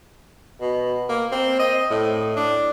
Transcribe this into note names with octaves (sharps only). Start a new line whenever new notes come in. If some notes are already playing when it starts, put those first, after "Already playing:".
B2
A#3
C4
D#5
A2
D4